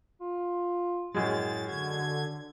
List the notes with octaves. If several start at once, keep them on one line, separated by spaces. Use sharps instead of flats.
F4
F#2 A2 G#3 A6
D3 F#4 G#6